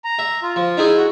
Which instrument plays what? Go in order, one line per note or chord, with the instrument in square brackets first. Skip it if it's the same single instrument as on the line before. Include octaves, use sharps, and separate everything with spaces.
[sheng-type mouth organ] A#5
[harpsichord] E5
[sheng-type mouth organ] F4
[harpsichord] F3
D#4 E4 G#4
[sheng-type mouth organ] F#4